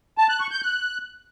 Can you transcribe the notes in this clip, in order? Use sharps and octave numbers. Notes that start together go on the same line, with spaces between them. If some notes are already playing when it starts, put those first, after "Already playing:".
A5
F#6
C#6
G6
F#6